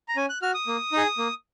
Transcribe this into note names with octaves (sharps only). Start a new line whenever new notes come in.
A#5
C#4 G#5
F#6
F#4 F6
D#6
A#3
D#4 G#4
A#3